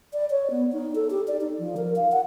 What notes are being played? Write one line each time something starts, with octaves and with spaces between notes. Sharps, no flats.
D5
C#5
B3
D#4
A4
G4
D5
D#4
F3
A#4
F5
F#5